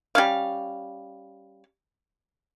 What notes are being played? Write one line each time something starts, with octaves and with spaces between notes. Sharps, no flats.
G3 C#4 F5